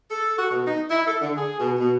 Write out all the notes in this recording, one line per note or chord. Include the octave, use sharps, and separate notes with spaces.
A4
F#4
B2
D#4
E4
A4
D3
G#4
B2
B2